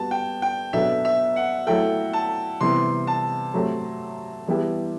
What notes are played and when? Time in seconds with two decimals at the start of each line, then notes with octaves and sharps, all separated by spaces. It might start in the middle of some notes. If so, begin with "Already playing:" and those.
Already playing: G3 B3 F#4 A5
0.11 G5
0.42 G5
0.73 B2 F#3 B3 D4 A4 E5
1.05 E5
1.36 F#5
1.67 F#3 A3 E4 A4 G5
2.13 A5
2.61 C3 E3 G3 B3 C6
3.07 A5
3.54 F#3 A3 C4 G4
4.47 E3 G3 B3 E4 G4